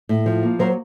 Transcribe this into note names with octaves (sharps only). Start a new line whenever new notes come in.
A2
F3
A#3
F#3 A#4 C5